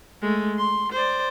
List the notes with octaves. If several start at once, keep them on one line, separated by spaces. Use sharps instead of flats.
G#3 A3
C6
C5 D5